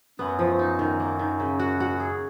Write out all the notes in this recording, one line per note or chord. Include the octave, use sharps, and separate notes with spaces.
F#2 B3
F3
D#4
D#3
A#3
D#3
C#3
F#4
F#4
G#4